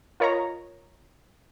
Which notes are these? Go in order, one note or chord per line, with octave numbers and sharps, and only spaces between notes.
F4 A#4 C#5 D#5 A#5